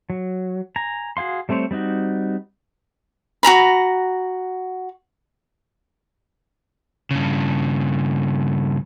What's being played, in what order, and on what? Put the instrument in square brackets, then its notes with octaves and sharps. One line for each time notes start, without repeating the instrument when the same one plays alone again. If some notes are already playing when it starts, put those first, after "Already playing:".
[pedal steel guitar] F#3
G#5 A#5
F#4 G#4 F5 C6
G3 A3 C4 C5 C#5
G3 C4 D#4 F#4
[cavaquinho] F#4 G#4 A#5 B5
[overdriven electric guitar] G2 C#3